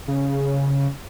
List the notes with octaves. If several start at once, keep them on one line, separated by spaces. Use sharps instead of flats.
C#3